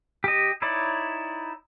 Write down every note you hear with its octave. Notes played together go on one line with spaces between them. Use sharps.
G4 D#5
D#4 E4 C#5 D5